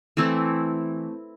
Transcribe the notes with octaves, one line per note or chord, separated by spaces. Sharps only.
E3 A3 C4 E4